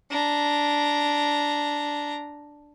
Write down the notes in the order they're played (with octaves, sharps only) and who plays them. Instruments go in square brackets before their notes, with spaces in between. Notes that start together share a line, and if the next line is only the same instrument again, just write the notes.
[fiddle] D4 A#5